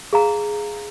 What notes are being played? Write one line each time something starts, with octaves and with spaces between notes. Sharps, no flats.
G#4 F5 A#5